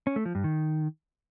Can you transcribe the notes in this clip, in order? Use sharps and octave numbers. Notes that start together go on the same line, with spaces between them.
C#4
A3
F3
G2
D#3